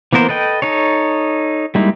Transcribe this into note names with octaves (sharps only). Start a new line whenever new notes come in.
E3 A#3 B3 A#4 C5
A4 B4 D#5 G5
D#4 A4 C#5
G3 G#3 A#3 D#4 E4